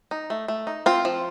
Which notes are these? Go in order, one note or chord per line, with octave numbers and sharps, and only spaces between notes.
D#4
A3
A3
D#4
C4 F4
F3